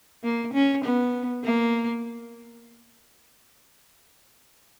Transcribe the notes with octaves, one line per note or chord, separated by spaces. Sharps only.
A#3
C#4
B3
A#3